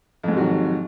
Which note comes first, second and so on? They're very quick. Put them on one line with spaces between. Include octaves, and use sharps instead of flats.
F2 G#2 C3 F#3 D#3